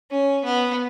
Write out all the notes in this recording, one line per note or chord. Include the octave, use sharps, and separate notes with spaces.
C#4
B3